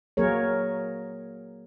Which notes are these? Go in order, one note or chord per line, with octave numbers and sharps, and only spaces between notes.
F#3 A#3 G#4 A#4 C#5